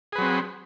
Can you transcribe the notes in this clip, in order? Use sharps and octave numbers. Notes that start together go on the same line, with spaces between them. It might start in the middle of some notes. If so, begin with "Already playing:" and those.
F#3 C4 G#4 B4